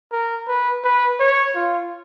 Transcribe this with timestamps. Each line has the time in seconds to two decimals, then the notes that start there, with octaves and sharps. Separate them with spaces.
0.12 A#4
0.48 B4
0.84 B4
1.20 C#5
1.56 F4